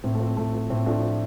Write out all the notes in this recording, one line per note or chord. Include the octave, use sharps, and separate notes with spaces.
A2 C4
A3
F3 C4
A2 A3
F3 A3
A2 C4
F3 A3 D4
F3